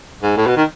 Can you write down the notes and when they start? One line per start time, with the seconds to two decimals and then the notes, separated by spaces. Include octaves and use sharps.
0.23 G#2
0.37 A2
0.47 B2
0.57 D#3